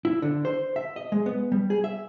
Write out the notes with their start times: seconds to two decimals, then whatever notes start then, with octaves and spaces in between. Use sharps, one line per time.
0.05 E4
0.22 D3
0.45 C5
0.76 E5
0.96 D#5
1.12 G#3
1.26 B3
1.52 G3
1.70 G#4
1.84 E5